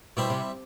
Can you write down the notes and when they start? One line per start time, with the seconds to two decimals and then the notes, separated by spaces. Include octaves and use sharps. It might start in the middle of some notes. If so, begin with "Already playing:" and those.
0.17 B2 G3 C4 E4
0.30 C3